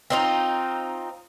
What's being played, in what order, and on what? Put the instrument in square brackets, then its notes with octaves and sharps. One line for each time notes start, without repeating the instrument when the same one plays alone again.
[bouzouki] C4 D#4 F4